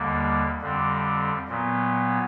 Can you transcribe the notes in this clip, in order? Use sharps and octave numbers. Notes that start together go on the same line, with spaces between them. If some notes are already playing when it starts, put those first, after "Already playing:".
Already playing: D#2 D3 G3 A#3
F2 D3 G3 C4
A#2 F#3 B3